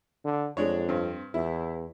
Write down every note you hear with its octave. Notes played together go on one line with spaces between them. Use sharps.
D3
F2 G#3 D4 C#5
G2 C4
E2 E4